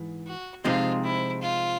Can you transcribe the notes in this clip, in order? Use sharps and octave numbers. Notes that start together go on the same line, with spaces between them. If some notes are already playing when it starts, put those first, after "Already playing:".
Already playing: G#2 E3
F#4
C3 F3 G#3 C4 D#4 F4
E4
F4